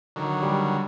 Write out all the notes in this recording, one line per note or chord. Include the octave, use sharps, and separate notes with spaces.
D3 D#3 F#3
G3